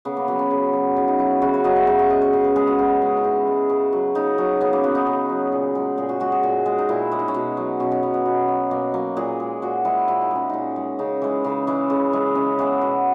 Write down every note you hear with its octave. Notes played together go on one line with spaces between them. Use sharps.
C#3 B3
A#3
F#3 B3
C#4
C#3
F#3
C#3 D#4
D#4
F#3 E4
C#3 F#4
C#5
F#3 D#5
E5
C#3 F#5
E5
G#3 D#5
C#5
C#3
B4
G#3 G#4
F#4
C#3
G#3
D#4
C#3 E4
G#3
C#3
F#3
C#3 D#4
F#3 C#4
C#3 B3
A#3
F#3 B3
D#4
C#3
F#3
A#2
G#3
A#2 G#4
F#4
G#3 F#4
G#4
A#2
G#3
D#4
A#2 E4
G#3 C#4
D#4
C#4
B2
F#3
B2 C#4
C#4
F#3 B3
B3
B2
F#3
B2 A#3
F#3 A#3
A#2 G#4
G#3
A#2 F#4
G#3 E4
A#2 E4
D#4
G#3 C#4
A#2 D#4
G#3
C#3 D#4
E3 G#3
C#3
E3 G#3
C#3
E3 G#3
C#3 C#4
E3 G#3 B3
B2 F#4